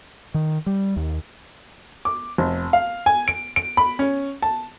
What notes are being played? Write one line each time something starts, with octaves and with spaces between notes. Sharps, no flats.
D#3
G3
D#2
D6
F1
F5
G#5
D7
D7
B5
C#4
A5